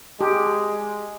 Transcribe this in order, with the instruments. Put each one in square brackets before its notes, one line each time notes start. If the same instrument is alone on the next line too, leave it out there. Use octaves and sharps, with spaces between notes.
[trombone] G#3 [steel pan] G4